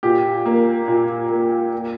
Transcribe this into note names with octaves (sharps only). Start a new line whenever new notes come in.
A#2 G4
A#3
A#2
A#3
A#3